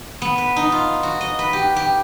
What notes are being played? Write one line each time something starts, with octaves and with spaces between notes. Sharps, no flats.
B3
B4
D#4
F4
F#4
D#5
B4
G4
G4